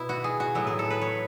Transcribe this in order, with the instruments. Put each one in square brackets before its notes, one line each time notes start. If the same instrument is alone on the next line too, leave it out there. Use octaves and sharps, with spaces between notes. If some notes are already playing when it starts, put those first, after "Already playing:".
Already playing: [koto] B2 B3 E4
F#4
G#4
F#4
A2 F#3 B3 E4
G#4
A4
B4
C#5